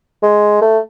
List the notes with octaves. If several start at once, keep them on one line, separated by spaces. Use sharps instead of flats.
G#3
A3